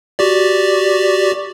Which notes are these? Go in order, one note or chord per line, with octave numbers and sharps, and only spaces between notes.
F#4 G4 D5